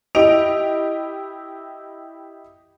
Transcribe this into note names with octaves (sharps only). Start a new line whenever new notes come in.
E4 G4 D#5 D7 F7